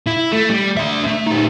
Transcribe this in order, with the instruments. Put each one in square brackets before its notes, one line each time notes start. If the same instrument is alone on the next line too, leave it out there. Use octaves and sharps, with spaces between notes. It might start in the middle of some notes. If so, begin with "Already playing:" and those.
[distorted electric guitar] E4
A3
G3
D4 E5
A3
G3 D#4